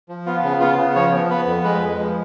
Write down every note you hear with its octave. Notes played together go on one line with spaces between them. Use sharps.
F3
B3 F4
C#3
B3 F4
C#3
F3 C#5
B3
B3 B4
F2
G#3 B4
G#3
F3